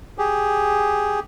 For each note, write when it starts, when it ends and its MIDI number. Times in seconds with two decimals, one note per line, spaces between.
0.18 1.20 67
0.18 1.20 68